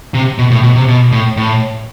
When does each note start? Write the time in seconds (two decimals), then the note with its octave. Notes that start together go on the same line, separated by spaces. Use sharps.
0.14 C3
0.38 B2
0.51 A2
0.63 B2
0.75 C3
0.88 B2
1.12 A2
1.37 A2